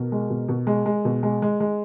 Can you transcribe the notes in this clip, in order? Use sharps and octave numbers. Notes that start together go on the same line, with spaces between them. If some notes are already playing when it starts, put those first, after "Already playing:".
Already playing: B2 A#4
G#3
B2
B2
G#3
G#3
B2
G#3
G#3
G#3